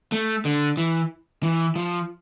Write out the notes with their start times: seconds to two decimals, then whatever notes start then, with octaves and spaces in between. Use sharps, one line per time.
0.12 A3
0.45 D3
0.77 E3
1.43 E3
1.76 F3